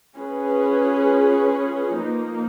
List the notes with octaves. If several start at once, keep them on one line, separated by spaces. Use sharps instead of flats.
C#4 F4 G#4 B4
F3 A#3 D#4